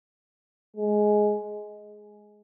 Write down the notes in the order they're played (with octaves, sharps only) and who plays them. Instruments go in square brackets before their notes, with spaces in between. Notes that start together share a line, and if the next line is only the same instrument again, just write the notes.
[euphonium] G#3